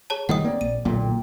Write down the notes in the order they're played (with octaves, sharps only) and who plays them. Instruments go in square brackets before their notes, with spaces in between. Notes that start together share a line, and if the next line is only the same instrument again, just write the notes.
[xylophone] G#4 C#5 A5
[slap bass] D#3 G3 A3 [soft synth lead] D#5 [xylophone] F#5 G5 D#6
[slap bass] A#3 C4 [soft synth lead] D5
[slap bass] A#1 [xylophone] D#7
[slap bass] D1 B1 A3 [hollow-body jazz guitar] A#2 [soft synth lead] G5